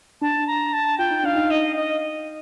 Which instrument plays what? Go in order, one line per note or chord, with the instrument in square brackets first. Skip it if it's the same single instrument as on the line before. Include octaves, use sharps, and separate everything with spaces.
[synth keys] D4 [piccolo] A5
[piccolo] A#5
A5
[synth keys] F4 [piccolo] G5
[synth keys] D#4
[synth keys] D4 [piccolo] F5
[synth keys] D#4
[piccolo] D#5
D#5